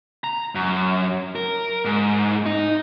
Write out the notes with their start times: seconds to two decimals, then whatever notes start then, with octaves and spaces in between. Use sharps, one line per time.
0.24 A#5
0.55 F#2
1.36 A#4
1.85 G#2
2.46 D#4